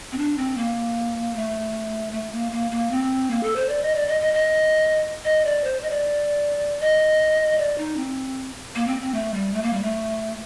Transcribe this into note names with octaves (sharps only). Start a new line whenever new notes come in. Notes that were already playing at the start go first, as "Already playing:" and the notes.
C4
D4
C4
A#3
A3
A3
A#3
A#3
A#3
C4
A#3
A4
C5
D5
D#5
D5
D#5
D#5
D#5
D#5
D5
C5
D#5
D5
D#5
D5
D#4
C4
A#3
C4
C4
A3
G3
A3
A#3
G3
A3